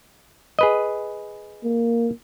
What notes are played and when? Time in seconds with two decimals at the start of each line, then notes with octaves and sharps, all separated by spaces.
0.59 G#4 B4 D#5
1.65 A#3